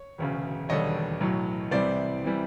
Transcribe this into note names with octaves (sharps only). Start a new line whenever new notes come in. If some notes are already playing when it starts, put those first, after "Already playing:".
Already playing: C#5
E1 D2 C#3
E1 D#2 D3 G3 C#5 D#5
B1 A2 F#3
C2 C3 E3 G3 C5 D5
C3 E3 G3